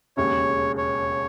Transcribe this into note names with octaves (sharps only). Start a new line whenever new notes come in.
E1 D#2 C#3 C#5
C#5